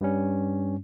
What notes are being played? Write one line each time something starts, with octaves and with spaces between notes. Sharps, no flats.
G2 G3 C#4